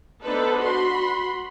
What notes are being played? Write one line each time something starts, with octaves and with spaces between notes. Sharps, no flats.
B3 D4 D#4 A4 B4 C5
F#4 B5 C6